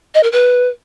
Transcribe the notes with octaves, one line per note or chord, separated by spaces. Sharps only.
D#5
A#4
B4